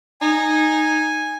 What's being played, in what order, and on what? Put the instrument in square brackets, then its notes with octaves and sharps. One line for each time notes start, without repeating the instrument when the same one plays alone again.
[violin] D#4 [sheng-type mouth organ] G#5